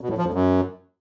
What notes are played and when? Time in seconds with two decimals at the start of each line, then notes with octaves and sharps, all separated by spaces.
0.01 B2
0.09 A2
0.17 F3
0.25 F2
0.34 F#2